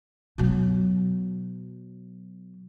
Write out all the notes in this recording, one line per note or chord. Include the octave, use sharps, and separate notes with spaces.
B2 F#3